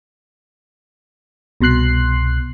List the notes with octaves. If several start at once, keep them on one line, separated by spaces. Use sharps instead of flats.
C2 B2 C6 F#6 C7